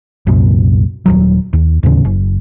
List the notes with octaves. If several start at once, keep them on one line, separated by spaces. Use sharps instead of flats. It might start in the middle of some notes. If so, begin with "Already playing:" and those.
C2 F#2 A#2
D#1 A#1 F#3
D#2
D#2 A2 C#3 C#4
F#1